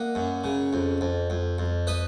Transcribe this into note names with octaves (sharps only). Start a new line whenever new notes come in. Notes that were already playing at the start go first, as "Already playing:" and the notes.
Already playing: A#3 D#5 F#5
F#2
C#3
F2
F2
F2
F2
B4 D#5